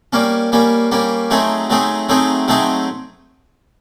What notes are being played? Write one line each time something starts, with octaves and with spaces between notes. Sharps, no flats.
G3 A#3 C#4
G3 A#3 C#4
G3 A#3 C#4
F#3 A3 C4 D#4 G#4
F#3 A3 C4 D#4 G#4
F#3 A3 C4 D#4 G#4
F#3 A3 C4 D#4 G#4